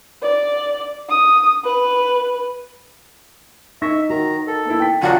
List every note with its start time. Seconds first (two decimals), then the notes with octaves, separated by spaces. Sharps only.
0.22 D5
1.09 D#6
1.64 B4
3.82 D#4 E5 C#6 A#6
4.10 D#3 F#4 A#5
4.47 A4 A#4
4.65 A#3 B3 E4
4.80 G5 B6
5.02 D#1 F#3 D4 F4 F#5 G5